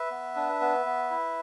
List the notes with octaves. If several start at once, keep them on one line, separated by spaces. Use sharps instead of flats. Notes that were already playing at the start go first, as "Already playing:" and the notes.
Already playing: B4 E5
B3
D4
B3
B3
E4